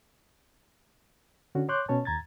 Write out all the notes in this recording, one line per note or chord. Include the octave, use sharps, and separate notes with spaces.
D3 C#4 F#4
C#5 C6 D6 F#6 G6
B2 C#4 C#5 A5
D#2 A#5 G#6 A6